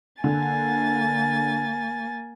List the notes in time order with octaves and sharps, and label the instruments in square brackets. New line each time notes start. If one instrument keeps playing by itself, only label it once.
[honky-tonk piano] D3 [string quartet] A#3 G#5 A6